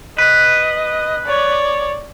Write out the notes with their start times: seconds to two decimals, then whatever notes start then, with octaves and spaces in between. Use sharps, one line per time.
0.18 B4 D#5
1.26 C#5 D5